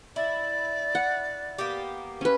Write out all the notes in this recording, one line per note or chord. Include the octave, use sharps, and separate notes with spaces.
E4 D5
F#5
A#3 B3 G4
C#4 B4